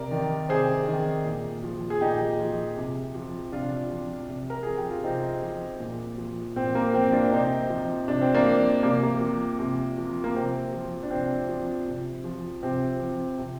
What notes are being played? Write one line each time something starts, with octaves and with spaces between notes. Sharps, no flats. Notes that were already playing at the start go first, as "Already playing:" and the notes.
Already playing: C3 A#4 D5
D#3
C3 G#4 C5
D#3
A#2
F3
G#4
A#2 D#4 G4
F3
C3
F3
C3 D4 F4
F3
C3
A#4
F3 G#4
G4
F4
C3 C4 D#4
F3
A#2
F3
A#2 C4
A#3
F3 C4
A#3 D4
C3 C4 D#4
F3
C3 D4
C4
A#3 D4
F3
C3 A#3
A#3
F3
C3
F3
A#3
C3 C4
F3
D4
C3 C4
F3
C3
F3
C3 C4
F3
C3